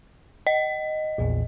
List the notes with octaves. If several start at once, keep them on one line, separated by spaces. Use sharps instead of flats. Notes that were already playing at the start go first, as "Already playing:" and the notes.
D#5
A#1 E2 A#2